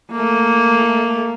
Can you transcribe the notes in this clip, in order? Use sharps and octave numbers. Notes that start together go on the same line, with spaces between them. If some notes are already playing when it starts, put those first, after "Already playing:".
A3 A#3